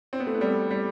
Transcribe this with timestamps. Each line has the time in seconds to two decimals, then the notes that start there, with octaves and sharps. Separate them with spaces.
0.13 C4
0.20 B3
0.27 A3
0.34 B3
0.41 G3
0.71 G3